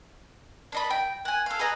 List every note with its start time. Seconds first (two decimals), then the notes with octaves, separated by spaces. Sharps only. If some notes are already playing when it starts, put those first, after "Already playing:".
0.72 D4 D#5 B5
0.90 G5
1.25 F#5 G#5
1.46 A4 F5
1.59 G#4 B4 D#5 A#5